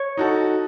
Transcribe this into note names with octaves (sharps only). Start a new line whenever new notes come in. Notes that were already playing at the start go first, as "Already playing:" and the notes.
Already playing: C#5
D#4 F#4 A4